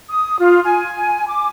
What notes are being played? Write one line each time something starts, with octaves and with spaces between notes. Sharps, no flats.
D#6
F4
G#5
D6